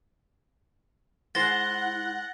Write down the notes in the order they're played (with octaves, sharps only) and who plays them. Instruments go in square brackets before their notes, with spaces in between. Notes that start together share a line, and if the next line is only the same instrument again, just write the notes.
[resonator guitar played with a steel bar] G#3 C5 [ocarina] E4 [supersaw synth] F#5 [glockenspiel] A6 A#6 G7